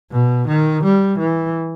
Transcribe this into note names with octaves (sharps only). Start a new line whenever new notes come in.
B2
D#3
G3
E3